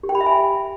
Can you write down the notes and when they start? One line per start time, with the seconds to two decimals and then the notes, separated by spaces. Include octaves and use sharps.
0.03 G4
0.09 G5
0.15 B5
0.21 E5
0.26 G#5